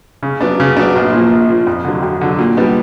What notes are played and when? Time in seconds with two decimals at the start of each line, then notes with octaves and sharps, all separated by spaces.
0.23 C#3
0.41 F#3 B3 D4
0.60 C#3
0.77 F#3 B3 D4
0.96 A#1
1.13 A#2 F3
1.31 A#1
1.49 A#2 F3
1.67 F2
1.84 D3 F#3
2.02 F2
2.21 D3 F#3
2.39 A#2
2.57 G3 B3 D4